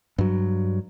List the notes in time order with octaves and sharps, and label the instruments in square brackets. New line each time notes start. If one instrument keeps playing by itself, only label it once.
[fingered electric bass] G2 F#3